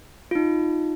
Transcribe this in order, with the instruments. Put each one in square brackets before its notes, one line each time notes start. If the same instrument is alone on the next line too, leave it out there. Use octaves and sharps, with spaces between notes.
[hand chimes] D#4 F4